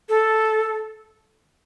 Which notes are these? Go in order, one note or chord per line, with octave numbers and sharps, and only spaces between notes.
A4